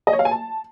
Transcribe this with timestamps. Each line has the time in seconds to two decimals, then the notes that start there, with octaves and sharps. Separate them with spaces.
0.07 D#5
0.13 C#5
0.19 F5
0.25 G#5
0.31 A5